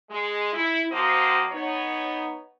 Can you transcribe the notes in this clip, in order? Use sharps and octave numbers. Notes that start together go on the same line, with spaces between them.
G#3
E4
F3 A#3 C4 F#4 C5 D#5
B3 D#4 C#5